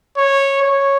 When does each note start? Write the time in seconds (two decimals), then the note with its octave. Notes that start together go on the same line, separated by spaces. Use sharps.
0.17 C#5
0.62 C#5